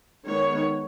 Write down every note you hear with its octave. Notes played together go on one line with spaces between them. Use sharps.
D#3 G#3 B3 C#5